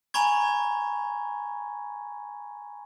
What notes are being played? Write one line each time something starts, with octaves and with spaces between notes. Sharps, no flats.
G#5 A#5 B5 C#6 G#6